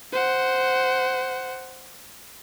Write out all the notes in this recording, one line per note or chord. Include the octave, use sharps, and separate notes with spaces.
C5 F#5